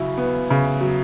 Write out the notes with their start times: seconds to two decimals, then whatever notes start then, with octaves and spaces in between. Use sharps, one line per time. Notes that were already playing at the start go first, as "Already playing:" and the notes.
Already playing: C#3 F#3 E4
0.18 B3
0.50 C#3
0.81 F#3